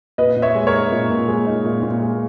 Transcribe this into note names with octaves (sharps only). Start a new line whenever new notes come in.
A#2 B4 D#5
A#2
C#5 E5
G#3
A#4 C#5
D#4
A#2
A#2
G#3
D#4
A#2
A#2
G#3